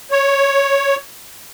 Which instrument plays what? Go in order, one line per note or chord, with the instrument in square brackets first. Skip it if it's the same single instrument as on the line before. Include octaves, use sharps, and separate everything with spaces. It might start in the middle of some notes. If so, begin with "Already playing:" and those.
[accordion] C#5